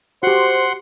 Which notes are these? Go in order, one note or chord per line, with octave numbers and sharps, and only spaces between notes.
F#4 G4 C5 F#5 C6